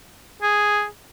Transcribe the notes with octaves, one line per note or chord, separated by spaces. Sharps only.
G#4